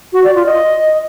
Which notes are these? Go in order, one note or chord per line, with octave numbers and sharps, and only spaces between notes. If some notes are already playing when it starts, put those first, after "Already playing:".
F#4
D5
F4
D#5